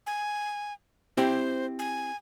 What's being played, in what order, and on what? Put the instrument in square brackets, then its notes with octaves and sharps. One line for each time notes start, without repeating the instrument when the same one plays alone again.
[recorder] G#5
[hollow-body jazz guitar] C4 E4 G4 [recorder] C5
[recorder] G#5